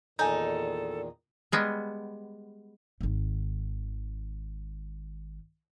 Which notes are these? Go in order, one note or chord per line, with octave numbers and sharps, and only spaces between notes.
E2 A#2 D#3 D#4 A4 G#5 G6
G3 G#3 B3
G#1 D#3